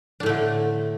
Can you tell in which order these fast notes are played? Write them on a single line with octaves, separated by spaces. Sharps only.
D4 A2 A3 D3